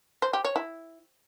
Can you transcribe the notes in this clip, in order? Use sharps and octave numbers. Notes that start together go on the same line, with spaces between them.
C5
G4
C#5
E4